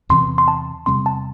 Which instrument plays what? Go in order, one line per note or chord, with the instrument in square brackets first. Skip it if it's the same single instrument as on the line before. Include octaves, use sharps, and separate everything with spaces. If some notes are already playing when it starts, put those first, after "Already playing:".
[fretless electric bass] E2 C3 E3 C4 [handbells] C6
[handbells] C6
A5
[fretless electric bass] E2 C3 G3 C4 [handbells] C6
[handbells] A5